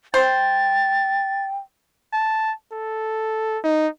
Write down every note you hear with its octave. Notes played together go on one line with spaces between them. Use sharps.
C5 G5 A6
A5
A4
D#4